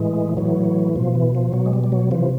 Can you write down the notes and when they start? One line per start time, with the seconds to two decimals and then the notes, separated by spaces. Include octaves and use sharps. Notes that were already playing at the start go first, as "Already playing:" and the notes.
Already playing: A2 E3 G#3
0.37 A2 E3 F#3
0.95 B2 F3
1.15 E3
1.35 F3
1.53 B2 F#3
1.66 G#3
1.73 G3
1.84 G3
1.92 F#3
2.11 C3 E3 F3